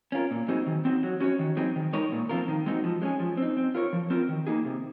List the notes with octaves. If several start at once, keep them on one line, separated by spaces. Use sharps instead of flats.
C#4 F4 A#4
A#2
F#3 C4 D#4 G#4
D#3
F#3 C4 D#4
F#3
C#4 F#4 C#5
D#3
F#3 C4 D#4 G#4
D#3
G#3 D#4 A#4 C#5
A#2
F3 C4 F4 A#4
D#3
G#3 C4 D#4 F#4
F3
G#3 C#4 G#4
F3
C4 D#4
C4
F4 A#4 C#5
F3
C4 F4 A#4
D#3
A#3 D#4 G#4
C3